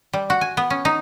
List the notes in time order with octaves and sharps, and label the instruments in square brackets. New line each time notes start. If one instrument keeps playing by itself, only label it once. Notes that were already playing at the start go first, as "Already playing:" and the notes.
[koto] G3
F#4
G#5
B3
C#4
D#4